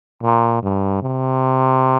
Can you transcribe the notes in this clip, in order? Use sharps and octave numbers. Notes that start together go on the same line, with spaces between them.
A#2
G2
C3